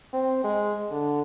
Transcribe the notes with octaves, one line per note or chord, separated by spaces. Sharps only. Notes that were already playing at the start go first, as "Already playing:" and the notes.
C4
G#3
D3